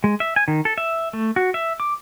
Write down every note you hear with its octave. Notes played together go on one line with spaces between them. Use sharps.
G#3
E5
G#5
D#3
A4
E5
A3
F#4
E5
D6